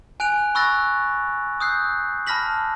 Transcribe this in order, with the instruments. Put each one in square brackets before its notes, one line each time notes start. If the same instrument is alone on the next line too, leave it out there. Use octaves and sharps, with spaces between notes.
[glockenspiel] G#5 F#6 D7 F7
B5 C#6 E6 F#6 A6 A#6
D#6 E6 F#6 G6 C7
A5 B5 F6 A#6 B6 F#7